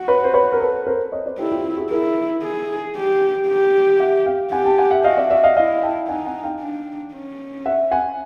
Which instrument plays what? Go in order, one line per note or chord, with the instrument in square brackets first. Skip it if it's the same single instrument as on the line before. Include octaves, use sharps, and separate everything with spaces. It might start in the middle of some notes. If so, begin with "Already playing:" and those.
Already playing: [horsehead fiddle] F#4
[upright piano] B4 C#5
C5
B4 C#5
A#4
A4 B4
A#4 C5
C#5 D#5
C5 D5
[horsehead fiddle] E4 [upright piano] G4 A4
[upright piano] F4 G4
F4 G4
F#4 G#4
[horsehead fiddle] E4 [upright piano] G#4 A#4
[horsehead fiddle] G#4
G4
G4
[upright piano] E5 F#5
F5 G5
[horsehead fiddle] G4 [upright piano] F#5 G#5
[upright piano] G5 A5
F#5 G#5
E5 F#5
[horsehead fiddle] F#4 [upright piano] D#5 F5
[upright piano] D5 E5
D5 E5
D#5 F5
[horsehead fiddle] E4 [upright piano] D#5 F5
[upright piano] G5 A5
[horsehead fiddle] D#4 [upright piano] F#5 G#5
[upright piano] F#5 G#5
F5 G5
[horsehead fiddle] D4
C#4
[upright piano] E5 F#5
F#5 G#5